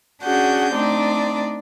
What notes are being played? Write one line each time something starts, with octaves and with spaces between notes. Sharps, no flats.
C#4 D4 F#4 G#4 F#5 G6
A3 C4 D4 D#4 D5